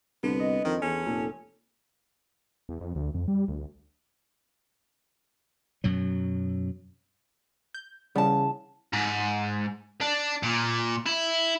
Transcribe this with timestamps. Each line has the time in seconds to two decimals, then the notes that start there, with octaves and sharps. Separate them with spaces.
0.23 C2 D3 B3
0.40 D#5
0.65 F2 D#3
0.82 E2 C#4 A4
1.06 F1 A#2
2.69 E2
2.81 F2
2.95 D2
3.14 F2
3.28 G3
3.48 D2
5.84 F#2 B2 F#3
7.74 G6
8.15 E2 C#3 G3 B3 A5
8.93 G#2
10.01 D4
10.43 A#2
11.06 E4